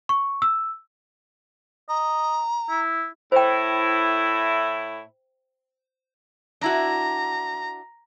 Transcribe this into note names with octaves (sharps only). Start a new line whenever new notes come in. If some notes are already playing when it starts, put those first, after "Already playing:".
C#6
E6
D#5 A#5
E4
A2 E4 C5 G5
D4 E4 F#4 A#5